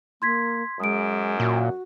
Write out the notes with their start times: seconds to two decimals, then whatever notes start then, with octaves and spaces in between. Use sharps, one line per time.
0.22 A#3 C6 G#6 B6
0.80 F#2 G#3 D#6 D7
1.40 A#2 F#4